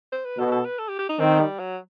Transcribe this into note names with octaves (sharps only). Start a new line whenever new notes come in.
C5
B4
B2 A4
A4
B4
A4
G4
G4
D#4
D#3 C4
G3
F#3